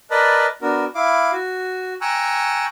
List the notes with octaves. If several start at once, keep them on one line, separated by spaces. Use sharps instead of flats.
A#4 B4 D5 D#5 A5 B5
B3 D4 F#4 A#4
E4 F5 D6
F#4
G5 G#5 A#5 C#6 E6 F#6